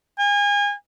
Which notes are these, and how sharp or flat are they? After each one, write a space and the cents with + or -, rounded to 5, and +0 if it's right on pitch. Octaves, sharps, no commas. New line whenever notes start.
G#5 -30